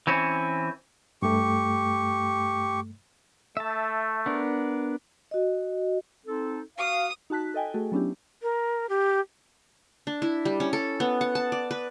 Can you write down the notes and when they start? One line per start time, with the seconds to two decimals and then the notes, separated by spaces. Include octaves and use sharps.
0.07 E3 C4 C#4
1.22 G2 A3 G4 C#6
3.57 A3 E5 A5
4.26 B3 D4 A#4
5.31 F#4 D#5
6.26 C4 D#4 A4
6.78 F#4 F5 D#6
7.30 D#4 F#4 A5 F#6 B6
7.54 A4 D#5 G5 G#5
7.74 A3 F#4 G#4 A4
7.92 F#3 B3 C#4 D4 E4 G4
8.42 A#4
8.89 G4
10.07 D4
10.22 E4
10.45 G3
10.60 C#4
10.73 A4
11.00 B3
11.21 F#5
11.35 A5
11.52 D5
11.71 B4